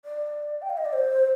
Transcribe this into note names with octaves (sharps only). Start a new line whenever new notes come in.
D5
G5
F5
D#5
D5
C5